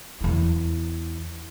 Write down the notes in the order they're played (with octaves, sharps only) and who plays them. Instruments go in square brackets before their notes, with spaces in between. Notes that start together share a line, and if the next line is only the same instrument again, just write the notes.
[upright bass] E2 E4